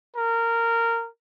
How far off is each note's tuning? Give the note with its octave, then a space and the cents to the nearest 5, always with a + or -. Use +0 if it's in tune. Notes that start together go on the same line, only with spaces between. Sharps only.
A#4 -15